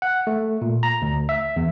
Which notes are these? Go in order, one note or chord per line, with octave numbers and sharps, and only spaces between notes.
F#5
A3
A#2
A#5
D2
E5
E2